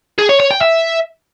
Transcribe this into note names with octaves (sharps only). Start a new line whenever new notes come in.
G#4
C#5
C#5
G5
E5